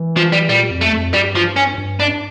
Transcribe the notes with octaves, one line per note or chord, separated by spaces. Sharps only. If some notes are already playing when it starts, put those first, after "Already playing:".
Already playing: E3
F3
G3
A#2 G3
F2
A3
F2
G2 G3
F3
C#4
G2
D4